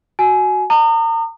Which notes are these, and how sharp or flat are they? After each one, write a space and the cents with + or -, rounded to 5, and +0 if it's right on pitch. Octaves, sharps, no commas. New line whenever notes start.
F#4 +5 G#5 +25
A#5 -40 D#6 -35